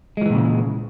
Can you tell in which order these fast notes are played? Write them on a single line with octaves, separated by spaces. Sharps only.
G#3 F3 E3 A#2 C#3